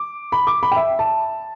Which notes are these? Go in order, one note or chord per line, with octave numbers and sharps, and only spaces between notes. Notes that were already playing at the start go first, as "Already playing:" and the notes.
Already playing: D6
B5
D6
B5
G5
E5
A5